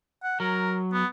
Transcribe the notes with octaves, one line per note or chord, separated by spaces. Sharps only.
F#5
F#3 A#4
B3